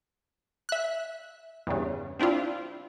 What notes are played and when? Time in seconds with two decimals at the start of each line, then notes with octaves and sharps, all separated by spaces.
0.69 E5 F#6
1.67 E2 G2 C#3
2.19 C4 D4 E4 F4